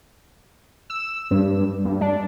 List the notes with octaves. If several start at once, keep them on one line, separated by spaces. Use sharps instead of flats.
E6
G2
G2
D4